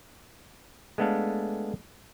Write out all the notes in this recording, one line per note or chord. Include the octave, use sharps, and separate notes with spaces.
G#3 A3 B3 D4 A4 F5